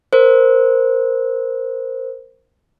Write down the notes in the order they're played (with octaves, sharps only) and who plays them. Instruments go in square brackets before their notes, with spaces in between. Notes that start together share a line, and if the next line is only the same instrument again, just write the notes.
[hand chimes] A#4 C5